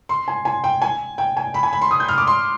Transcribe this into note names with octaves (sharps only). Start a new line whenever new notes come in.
C6
G#5
G#5
G5
G#5
G5
G#5
B5
G#5
B5
C6
D#6
G6
F6
D6
C6